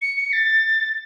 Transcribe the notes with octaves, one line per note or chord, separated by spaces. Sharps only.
C#7
C#7
A6